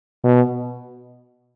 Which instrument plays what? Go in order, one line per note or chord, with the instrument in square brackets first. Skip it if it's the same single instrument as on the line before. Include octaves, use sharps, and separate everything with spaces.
[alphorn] B2